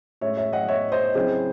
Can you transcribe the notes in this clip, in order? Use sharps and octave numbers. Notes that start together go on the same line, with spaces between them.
A2 G#3 C#4 C#5 E5
C#5 E5
D#5 F#5
C#5 E5
C5 D#5
C#3 F#3 C4 E4 G#4 C5